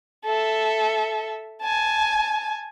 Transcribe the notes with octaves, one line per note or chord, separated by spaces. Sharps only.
A4 E5
G#5 A5